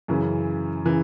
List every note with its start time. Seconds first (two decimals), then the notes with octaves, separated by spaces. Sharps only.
0.08 F#2 C#3 E3
0.85 C#3 E3